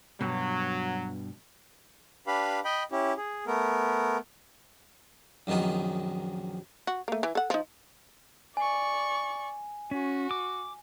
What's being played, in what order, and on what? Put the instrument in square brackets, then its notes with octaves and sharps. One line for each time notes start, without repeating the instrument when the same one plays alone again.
[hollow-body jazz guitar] G2 B2 [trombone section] F#3
[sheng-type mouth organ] D4 G4 B4 F5 B5
D#5 G5 B5
C#4 E4 G4
G#4
A3 B3 A#4
[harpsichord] A#1 F#2 D#3 B3 D#4
[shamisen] F#4
A3 A#3
E3
A4 F#5
F3 D#4
[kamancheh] D5 C#6 [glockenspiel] G#5
[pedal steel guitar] C#4 [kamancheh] F#4
[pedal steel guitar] D6